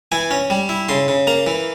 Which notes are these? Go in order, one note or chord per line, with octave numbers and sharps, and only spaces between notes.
E3 G#5
C#4
G3
E4
C#3 C6
C#3
A#3 A#5
E3